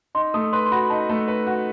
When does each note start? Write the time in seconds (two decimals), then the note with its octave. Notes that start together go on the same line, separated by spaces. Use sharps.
0.15 D#4 C6
0.34 A3 D#6
0.53 B4 C6
0.66 C6
0.72 F#4 B5
0.90 D#4 A5
1.09 A3
1.28 B4
1.47 F#4